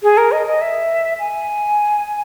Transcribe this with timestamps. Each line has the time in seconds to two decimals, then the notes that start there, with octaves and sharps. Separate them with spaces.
0.03 G#4
0.17 A#4
0.32 D#5
0.46 D#5
0.61 E5
1.19 G#5